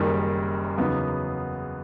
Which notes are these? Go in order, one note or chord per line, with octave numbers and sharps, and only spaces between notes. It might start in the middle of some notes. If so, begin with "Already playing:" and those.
Already playing: F#1 F#2 D#3 G3
E2 C#3 F#3 B3 D#4